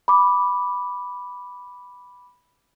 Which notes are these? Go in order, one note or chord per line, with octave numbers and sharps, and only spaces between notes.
B5 D6